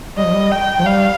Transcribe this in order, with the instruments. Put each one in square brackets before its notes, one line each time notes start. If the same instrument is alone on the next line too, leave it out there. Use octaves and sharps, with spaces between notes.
[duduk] G3 [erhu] D#5
[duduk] F3
G3
[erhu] G5
[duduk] F3
[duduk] G3 [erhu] F5